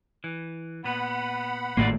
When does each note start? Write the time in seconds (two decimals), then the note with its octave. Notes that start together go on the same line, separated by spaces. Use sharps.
0.24 E3
0.84 A#2 B3 F#5 B5
1.77 G#1 A2 A#3 F4 F#4 D5